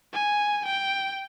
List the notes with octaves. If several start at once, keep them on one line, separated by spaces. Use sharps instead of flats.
G#5
G5